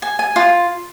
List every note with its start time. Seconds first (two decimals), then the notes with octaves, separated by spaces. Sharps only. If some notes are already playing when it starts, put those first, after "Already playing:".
0.02 G#5
0.19 G#5
0.36 F4